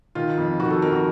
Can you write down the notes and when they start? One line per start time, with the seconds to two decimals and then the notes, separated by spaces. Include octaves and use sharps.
0.15 D#3 F4
0.37 F2
0.59 D#3 F#4
0.70 A4
0.81 F2 A#4
0.92 F#4